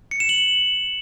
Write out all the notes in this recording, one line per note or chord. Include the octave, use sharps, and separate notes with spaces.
C#7
E7
F#7